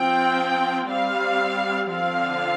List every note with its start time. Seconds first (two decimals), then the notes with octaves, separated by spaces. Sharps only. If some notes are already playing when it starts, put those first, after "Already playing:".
Already playing: F3 C4 G5
0.89 G3 C4 F5
1.91 D3 F3 C4 F5